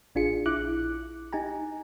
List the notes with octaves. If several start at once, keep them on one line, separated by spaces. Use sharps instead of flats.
A1 D4 F4 G#4 C#7
A#1 E4 D6 F#6
D#4 G4 G#5 A#5